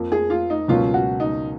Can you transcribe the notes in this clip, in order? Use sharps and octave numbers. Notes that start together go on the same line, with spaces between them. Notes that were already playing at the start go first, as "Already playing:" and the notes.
Already playing: F2 F3 A#3
G#4
F4
D#4
C#2 B2 F#3 A#3 C#4 F4
F#4
D#4